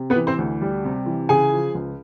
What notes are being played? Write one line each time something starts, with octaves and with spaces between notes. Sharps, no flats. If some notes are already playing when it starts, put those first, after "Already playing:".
Already playing: C3
B3 B4
E3
C4 C5
D2
G3
C3
E3
C#3 G#4 G#5
F3
C#2